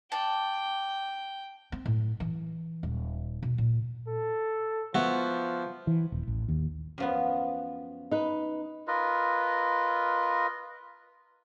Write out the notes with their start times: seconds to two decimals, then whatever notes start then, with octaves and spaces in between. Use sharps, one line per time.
0.12 D5 G5 A5
1.72 C4
1.86 A2
2.20 E3
2.83 D#1
3.43 B2
3.58 A#2
4.08 A4
4.95 F3 B3 E4 F#4
5.87 E3
6.12 D#1
6.28 A1
6.48 D#2
6.98 F#2 F3 B3
8.11 D#4 B4
8.88 F4 A#4 B4 D#5